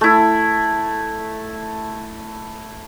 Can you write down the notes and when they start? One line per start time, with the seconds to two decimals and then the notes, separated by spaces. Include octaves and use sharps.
0.01 A3 E4